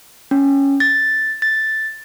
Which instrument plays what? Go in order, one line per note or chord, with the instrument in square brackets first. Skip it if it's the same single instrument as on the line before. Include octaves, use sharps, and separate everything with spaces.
[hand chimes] C#4
A6
A6